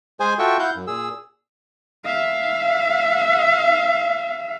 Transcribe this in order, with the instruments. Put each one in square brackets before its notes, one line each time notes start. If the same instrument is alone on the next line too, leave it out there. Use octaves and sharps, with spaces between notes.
[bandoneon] G#3 G#4 C5 G#5
F4 F#4 A4 E5 G5 C#6
E4 F5 F#5 G6
F#2
A#2 G#4 E6
[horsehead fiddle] E5 F5